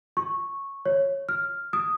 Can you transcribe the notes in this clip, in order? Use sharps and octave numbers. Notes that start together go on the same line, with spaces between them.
C#6
C#5
F6
D#6